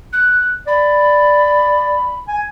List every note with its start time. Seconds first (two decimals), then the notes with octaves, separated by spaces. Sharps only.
0.12 F#6
0.67 D5 B5
2.28 G#5